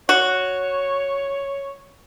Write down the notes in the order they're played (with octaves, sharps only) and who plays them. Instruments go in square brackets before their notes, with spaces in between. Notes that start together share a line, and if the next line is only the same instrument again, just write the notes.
[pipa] F#4 [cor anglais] C#5